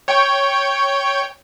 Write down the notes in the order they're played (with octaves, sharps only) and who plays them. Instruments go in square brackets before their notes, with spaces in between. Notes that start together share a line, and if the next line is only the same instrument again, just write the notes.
[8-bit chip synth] C#5 G5